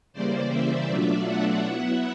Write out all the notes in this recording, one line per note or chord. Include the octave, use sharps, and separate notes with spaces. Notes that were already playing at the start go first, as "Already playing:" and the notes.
C#3 E3 G3 A#3 C5 D5
D5 E5
B2 F#3 A3 D4 F4
E5 F#5
F#3 B3 E4